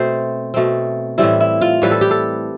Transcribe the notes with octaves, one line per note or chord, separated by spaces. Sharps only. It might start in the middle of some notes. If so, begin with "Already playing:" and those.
Already playing: B2 A3 C4 C5
B2 A3 C4
A2 E3 G3 C4 E4
E4
F4
A2 E3 G3 C4 B4
A4
G4
A4